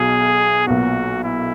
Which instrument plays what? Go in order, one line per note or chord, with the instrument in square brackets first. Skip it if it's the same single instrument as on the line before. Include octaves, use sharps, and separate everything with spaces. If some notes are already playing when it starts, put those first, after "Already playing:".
Already playing: [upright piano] B1 B2 F#3 [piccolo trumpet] G#4
[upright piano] B1 A#2 F#3 B3 [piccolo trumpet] F#4
[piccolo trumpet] E4